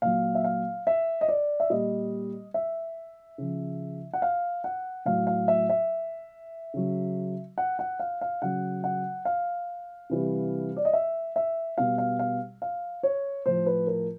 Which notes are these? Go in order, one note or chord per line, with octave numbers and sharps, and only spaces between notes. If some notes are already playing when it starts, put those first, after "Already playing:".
A#2 F#3 F5
E5
F5
E5
D#5
D5
E5
A#2 G3 D#5
E5
C#3 F3
F#5
F5
F#5
A2 F#3 F5
F5
E5
E5
C#3 F#3
F#5
F#5
F5
F5
C#3 F#3 F#5
F#5
F5
C3 E3 G3
D5
D#5
E5
E5
B2 G3 F5
F5
F5
F5
C#5
A2 F3 C5
B4
A#4